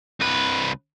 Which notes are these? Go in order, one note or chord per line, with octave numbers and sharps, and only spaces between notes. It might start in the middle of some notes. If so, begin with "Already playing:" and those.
C2 B4